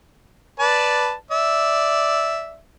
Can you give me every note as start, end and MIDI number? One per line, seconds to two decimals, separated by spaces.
0.60 1.13 71
0.60 1.13 74
0.60 1.13 81
1.31 2.59 74
1.31 2.59 76